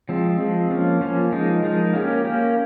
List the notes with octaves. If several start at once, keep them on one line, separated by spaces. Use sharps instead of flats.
F3 G#3 C4
F3 G#3 C4
F3 A#3 C#4
F3 A#3 C#4
F3 G#3 D#4 A#4
F3 G#3 D#4 A#4
A#3 C#4 G4 A#4
A#3 C#4 G4 A#4